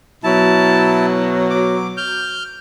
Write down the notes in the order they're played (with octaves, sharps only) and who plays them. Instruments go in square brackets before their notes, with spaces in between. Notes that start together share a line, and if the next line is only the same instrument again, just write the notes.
[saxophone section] B2 F#3 [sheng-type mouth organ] E4 A5
[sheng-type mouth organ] D6
F6 G6